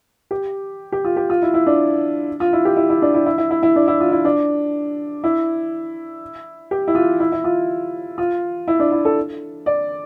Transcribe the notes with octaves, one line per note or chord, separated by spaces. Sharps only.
G4
G4
F4
G4
F4
E4
E4
D4
F4
E4
G4
E4
E4
D4
E4
E4
E4
E4
E4
D4
E4
F4
E4
D4
E4
G4
E4
F4
E4
E4
F4
F4
E4
D4
E4
A4
D5